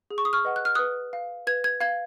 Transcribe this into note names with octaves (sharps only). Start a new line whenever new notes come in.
G#4
C#6
D#6
C#6 F6
B4 D#5 F#5
F#6
F6
B4 D#6 F#6
F5
B4 G#6
G#6
F5 G#6